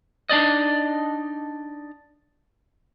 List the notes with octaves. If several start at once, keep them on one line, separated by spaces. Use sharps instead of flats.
D4 D#4 D5 D#5